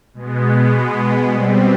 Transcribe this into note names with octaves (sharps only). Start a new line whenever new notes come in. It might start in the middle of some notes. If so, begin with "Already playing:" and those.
B2 G#3 B3
B2 G3 C4